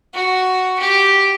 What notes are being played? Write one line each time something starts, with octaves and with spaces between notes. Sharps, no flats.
F#4
G4